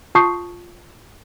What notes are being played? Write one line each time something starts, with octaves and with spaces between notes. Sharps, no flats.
F4 A5 C#6 D#6 G6 C7